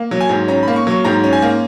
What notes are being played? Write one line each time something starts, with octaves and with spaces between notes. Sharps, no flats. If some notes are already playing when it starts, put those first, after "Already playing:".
Already playing: A#3
F#3
G#5
G#2
C#4 A#5
B5
A#3
C#6
F#3 C#6
G#2 A#5
C#4
G#5
A#3